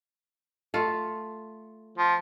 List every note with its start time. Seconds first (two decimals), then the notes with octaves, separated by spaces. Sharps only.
0.74 A3 F4
1.98 F3